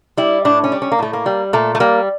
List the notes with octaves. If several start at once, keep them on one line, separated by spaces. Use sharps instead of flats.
G3 E4
A2 D4
C#4
G3
C#4
A#3
A2 A3
A#3
G3
A#2 A3
A3
G3 A#3